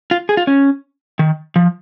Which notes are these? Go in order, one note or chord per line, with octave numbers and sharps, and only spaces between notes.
F4
G#4
F4
C#4
D#3
F3